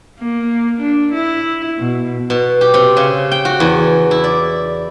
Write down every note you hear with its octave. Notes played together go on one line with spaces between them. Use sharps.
A#3
D4
E4
B2
B2
G4
C3
C#3
G5
F#4
E2
E4
D5